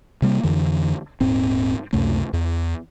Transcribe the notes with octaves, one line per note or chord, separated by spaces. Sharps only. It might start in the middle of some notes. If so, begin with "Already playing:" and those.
C3 G3 A#3
F2 D3 E3
D#1 G#2 C4
C#2 F#2 C3 A3
E2